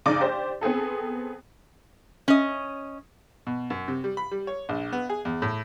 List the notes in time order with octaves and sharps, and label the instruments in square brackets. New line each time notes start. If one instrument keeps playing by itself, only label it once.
[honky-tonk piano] A#1 C#3 D#4 D5 D6
G4 C5 D5
B3 C4 G#4 A4
[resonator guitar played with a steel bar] C#4 D#5
[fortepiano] B2
F#2
C3
G3
B5
G3
C#5
A#1
B3
G#4
E2
A2